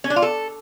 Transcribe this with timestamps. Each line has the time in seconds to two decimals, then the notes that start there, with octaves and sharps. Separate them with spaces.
0.04 C#4
0.10 D4
0.16 F4
0.22 A4